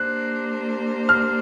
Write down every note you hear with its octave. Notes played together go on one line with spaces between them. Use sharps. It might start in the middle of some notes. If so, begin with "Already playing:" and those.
Already playing: A#3 D4 G4 C5 F#6
F6